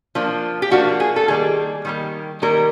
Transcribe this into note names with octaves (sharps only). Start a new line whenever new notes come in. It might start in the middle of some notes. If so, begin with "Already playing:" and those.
F3 A#3 D4
G4
F3 A#3 D4 F#4
G#4
A4
D#3 G3 A#3 G#4
D#3 G3 A#3
D#3 G3 A#3 A#4